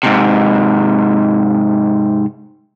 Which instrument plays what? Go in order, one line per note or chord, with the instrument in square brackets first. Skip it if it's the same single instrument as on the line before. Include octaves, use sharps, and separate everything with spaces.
[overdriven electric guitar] G#2 C3